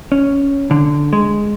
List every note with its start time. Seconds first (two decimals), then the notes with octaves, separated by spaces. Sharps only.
0.12 C#4
0.71 D3
1.13 G#3